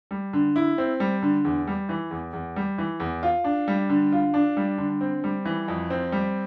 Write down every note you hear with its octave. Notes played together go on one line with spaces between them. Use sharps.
G3
D3
E4
C4
G3
D3
E2
G3
E3
E2
E2
G3
E3
E2
F4
D4
G3
D3
F4
D4
G3
D3
C4
G3
E3
F2
C4
G3